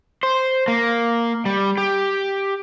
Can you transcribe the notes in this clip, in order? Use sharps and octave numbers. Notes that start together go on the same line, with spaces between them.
C5
A#3
G3
G4